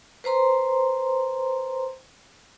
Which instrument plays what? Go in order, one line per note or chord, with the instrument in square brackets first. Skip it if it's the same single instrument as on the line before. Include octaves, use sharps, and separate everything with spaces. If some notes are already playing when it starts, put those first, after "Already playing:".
[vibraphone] B4 C5 A#5 C6